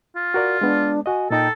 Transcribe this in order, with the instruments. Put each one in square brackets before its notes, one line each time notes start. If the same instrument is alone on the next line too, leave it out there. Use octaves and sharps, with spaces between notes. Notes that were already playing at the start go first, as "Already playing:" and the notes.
[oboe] F4
[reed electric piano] F#4 A#4 D5
[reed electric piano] G#3 B3 [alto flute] D4
[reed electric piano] F#4 D#5 [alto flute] G#5
[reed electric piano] A#2 D#4 A#5 [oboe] A4 [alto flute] G5